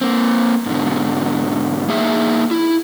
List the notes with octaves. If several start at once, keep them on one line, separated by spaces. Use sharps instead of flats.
A#3 C4
G#2 B2 D3
A#3 D#4 G#4 E5
E4